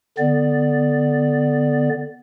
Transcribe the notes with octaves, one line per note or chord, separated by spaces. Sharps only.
D3 B3 D5